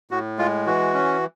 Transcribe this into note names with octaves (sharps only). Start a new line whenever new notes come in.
A2 F#4
G#3 F4
E3 F#4
C#4